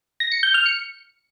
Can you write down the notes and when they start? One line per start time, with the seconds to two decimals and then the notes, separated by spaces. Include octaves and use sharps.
0.20 A#6
0.32 C#7
0.43 G6
0.54 F6
0.66 C#7